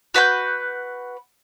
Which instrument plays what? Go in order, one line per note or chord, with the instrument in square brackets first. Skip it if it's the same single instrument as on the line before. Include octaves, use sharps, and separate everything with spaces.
[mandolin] F#4 B4 F#5 G6